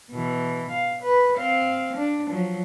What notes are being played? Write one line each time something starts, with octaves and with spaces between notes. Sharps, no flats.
B2 E3
F5
B4
C4 F5
D4
F3 F#3